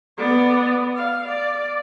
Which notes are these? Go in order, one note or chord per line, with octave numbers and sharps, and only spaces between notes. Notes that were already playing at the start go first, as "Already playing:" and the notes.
B3 D5
F5
D5